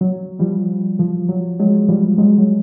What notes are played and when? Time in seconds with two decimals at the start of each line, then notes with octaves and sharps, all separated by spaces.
0.01 F#3
0.39 F3 G3
0.99 F3
1.29 F#3
1.60 F#3 G#3
1.89 F3 G3
2.18 F#3 G#3
2.38 F#3